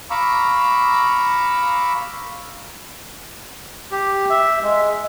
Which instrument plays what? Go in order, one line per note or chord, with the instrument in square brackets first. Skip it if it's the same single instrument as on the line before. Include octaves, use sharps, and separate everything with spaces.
[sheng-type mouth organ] F5 A#5 B5 C#6 D6 E6
[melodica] G4
E5
G#3